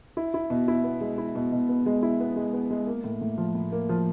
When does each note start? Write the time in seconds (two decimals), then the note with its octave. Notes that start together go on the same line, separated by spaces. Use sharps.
0.17 E4
0.34 E4
0.50 B2
0.68 E4
0.84 B3
1.01 G#3
1.18 E4
1.35 B2
1.52 B2
1.69 B3
1.86 G#3
2.03 E4
2.20 B3
2.36 G#3
2.53 B3
2.71 G#3
2.87 A#3
3.04 A2
3.21 A2
3.38 F3
3.55 A2
3.72 A#3
3.89 F3